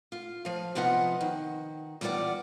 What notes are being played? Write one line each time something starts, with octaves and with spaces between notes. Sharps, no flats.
F4
F3 F5
C3 F3 B3 F4 D#5 F#5
D#3
E2 G3 F4 G#4 D5 F#5